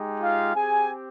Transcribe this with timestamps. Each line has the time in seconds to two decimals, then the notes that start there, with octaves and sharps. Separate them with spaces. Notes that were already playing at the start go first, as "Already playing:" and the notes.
Already playing: G#3 D#4 G4
0.20 F4 F5
0.55 C4 G4 G#4 G#5